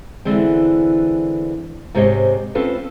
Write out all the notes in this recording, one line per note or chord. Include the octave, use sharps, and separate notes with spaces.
D3 E3 G#3 C4
G#2 C3 G4 C#5 D#5
C4 C#4 F4 A4 B4